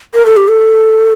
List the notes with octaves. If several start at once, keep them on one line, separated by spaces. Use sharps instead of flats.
A#4
A4
G4
A4